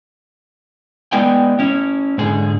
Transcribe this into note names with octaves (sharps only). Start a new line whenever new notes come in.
G#3 B3 E4 D5 G5 G#5
C#4 E4
G#2 D3 G#4